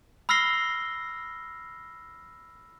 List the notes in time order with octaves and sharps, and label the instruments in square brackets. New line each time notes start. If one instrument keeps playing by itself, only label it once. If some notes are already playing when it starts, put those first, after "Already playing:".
[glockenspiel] B5 E6 F6 A#6 C7 G7